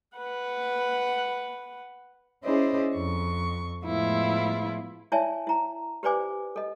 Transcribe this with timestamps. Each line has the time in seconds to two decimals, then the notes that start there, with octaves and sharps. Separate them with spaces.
0.17 B4 F#5
2.43 C#4 E4 G#4 C5 D5 D#5
2.95 F2 C#6
3.83 A2 F3 G#3 B3 E4 F4
5.12 E4 C#5 D5 E5 G#5 A5
5.47 E4 A#5
6.03 G4 B4 C5 D5 G#5 D6
6.56 A4 D#5